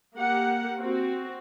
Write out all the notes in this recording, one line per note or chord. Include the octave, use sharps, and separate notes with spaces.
A#3 G4 F#5
C4 F#4